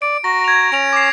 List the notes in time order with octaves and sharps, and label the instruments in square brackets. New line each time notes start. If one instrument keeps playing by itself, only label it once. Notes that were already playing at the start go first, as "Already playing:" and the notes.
[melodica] D5 [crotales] D7
[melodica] F#4 A#5 [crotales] A#6
[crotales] G#6 F7
[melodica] C#4 [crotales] D7 F7
[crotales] D6 C7